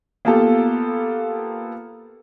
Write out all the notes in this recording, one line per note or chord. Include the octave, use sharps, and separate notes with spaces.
A#3 B3 F4 G4 A4